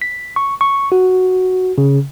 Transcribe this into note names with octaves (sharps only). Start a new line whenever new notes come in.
B6
C#6
C#6
F#4
C#3